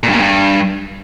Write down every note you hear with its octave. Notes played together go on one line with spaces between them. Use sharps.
A#2
G2
A#2
G2